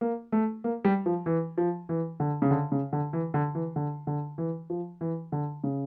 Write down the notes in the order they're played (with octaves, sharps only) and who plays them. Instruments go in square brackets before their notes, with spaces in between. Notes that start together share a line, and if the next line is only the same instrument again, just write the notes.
[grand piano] A#3
A3
A#3
G3
F3
E3
F3
E3
D3
C#3
D3
C#3
D3
E3
D3
E3
D3
D3
E3
F3
E3
D3
C#3